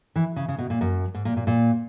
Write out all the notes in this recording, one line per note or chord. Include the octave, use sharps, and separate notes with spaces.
E3
C#3
C#3
B2
A#2
F#2
G#2
A#2
A#2
A#2